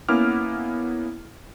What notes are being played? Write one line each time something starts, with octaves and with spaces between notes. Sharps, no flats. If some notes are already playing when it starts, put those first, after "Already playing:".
A#3 B3 C#4 E4 D6 F6